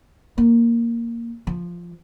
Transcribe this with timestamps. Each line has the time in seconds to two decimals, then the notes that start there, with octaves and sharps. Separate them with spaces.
0.38 A#3
1.47 F3